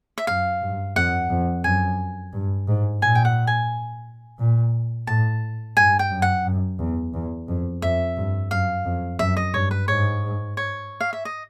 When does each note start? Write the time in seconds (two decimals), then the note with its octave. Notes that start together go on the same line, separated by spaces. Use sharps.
0.18 E5
0.27 F#2 F5
0.61 G2
0.96 F2 F#5
1.30 F2
1.64 F#2 G#5
2.33 G2
2.68 G#2
3.02 A#2 G#5
3.15 G5
3.25 F#5
3.47 G#5
4.39 A#2
5.07 A2 A5
5.76 G2 G#5
5.99 G5
6.10 F#2
6.22 F#5
6.45 F#2
6.79 E2
7.13 E2
7.48 F2
7.82 F2 E5
8.17 G2
8.51 F#2 F5
8.85 F2
9.19 F#2 E5
9.37 D#5
9.54 G2 C#5
9.71 B4
9.88 G#2 C#5
10.57 C#5
11.01 F5
11.13 E5
11.25 D#5